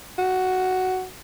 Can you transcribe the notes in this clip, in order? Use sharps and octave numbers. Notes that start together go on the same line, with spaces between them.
F#4